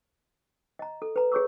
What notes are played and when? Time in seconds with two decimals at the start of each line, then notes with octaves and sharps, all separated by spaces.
0.79 D#5 A#5
1.02 A4
1.16 B4 A#5
1.32 G#4 B4 C#5 C#6 D6 E6